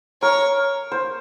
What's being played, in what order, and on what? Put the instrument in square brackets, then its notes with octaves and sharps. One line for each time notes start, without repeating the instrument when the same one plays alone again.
[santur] A#4 [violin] C#5
[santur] C5